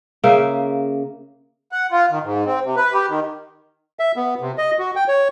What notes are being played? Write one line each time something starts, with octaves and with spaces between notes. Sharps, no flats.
C#3 A#3 A#4 E5
F#5
F4
D#3
G#2
C4
C3
B4
G4
D#3
E5
B3
C3
D#5
F#4
G5
C#5